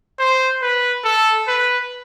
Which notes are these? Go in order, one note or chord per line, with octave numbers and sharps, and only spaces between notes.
C5
B4
A4
B4